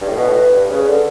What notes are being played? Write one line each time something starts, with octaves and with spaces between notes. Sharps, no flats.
G2
A2
B2 B4
A2
G2
C#3
D3 A4